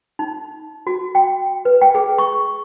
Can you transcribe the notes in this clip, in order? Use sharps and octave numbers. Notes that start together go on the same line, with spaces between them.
D#4
F#4
G5
B4
G5
G#4
C#6